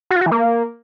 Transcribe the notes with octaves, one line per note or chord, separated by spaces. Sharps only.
F#4
F4
F#4
E3
A#3